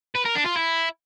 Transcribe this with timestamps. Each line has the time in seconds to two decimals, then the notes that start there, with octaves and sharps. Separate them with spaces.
0.15 B4
0.25 A#4
0.35 D4
0.46 F4
0.56 E4